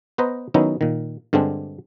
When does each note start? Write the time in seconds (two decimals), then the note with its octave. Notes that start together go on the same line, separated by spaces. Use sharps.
0.18 B3 B4 C5 D#5 A#5
0.54 D#3 F#3 B3 C#4 D#4 E4
0.81 A#2 D#3
1.33 G2 D3 G#3 C4 D4